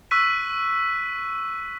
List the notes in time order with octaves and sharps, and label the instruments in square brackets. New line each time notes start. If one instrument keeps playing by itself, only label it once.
[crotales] C#6 E6 F#6 B6 D#7